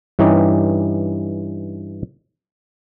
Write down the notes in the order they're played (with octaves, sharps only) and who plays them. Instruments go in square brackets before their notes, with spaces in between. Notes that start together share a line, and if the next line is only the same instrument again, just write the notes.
[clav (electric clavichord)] G2 E3 C#4 D#4 G4